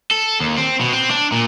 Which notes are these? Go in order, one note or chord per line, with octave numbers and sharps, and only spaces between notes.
A4
D#2
C4
B2
C4
D4
A#2